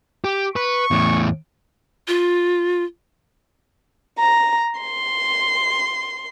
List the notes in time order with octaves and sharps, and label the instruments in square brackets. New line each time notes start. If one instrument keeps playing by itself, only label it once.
[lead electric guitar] G4
[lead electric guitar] B4 [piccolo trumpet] C#6
[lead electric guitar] E2 A2
[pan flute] F4
[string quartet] A#5
C6